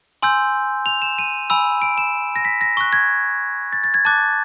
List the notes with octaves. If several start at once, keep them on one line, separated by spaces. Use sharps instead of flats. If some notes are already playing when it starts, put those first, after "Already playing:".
G#5 C6 E6 G6
F7
E7
D#7
G#5 B5 E6
D7
E7
A#6
B6
A#6
C#6 F#6
G#6
A6
A6
G#6
A5 D6 F#6 A6